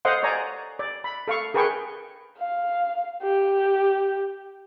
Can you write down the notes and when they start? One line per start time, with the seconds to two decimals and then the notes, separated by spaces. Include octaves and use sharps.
0.05 A4 C5 D#5 F5 F#5 C6
0.23 C#5 D5 G#5 A#5
0.79 D5
1.04 B5
1.28 A4 F5 C#6
1.54 G#4 A#4 B4 G5 C#6
2.38 F5
3.23 G4